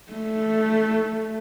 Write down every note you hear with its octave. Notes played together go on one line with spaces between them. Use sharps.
A3